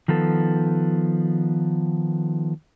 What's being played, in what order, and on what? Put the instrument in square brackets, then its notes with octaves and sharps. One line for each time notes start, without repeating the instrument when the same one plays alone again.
[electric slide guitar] D#3 F3 B3 A4